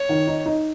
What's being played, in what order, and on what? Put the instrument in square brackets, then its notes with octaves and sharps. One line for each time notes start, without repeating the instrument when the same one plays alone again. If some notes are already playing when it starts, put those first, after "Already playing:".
Already playing: [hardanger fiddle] C#5
[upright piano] D#3
D#4
D#4